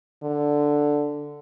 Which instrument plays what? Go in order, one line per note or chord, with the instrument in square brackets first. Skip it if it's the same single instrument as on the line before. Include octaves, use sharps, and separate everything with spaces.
[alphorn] D3